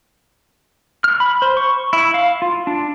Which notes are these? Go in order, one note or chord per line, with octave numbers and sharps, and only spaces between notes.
F6
B5
C5
C#6
E4
F5
F4
D4